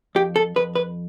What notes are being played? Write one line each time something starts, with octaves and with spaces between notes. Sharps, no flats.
F2 G4
A4
F2 B4
B4